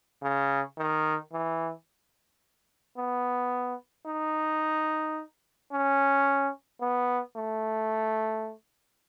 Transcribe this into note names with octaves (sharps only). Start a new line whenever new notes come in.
C#3
D#3
E3
B3
D#4
C#4
B3
A3